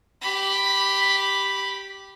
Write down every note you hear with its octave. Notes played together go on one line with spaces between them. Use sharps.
G4 B5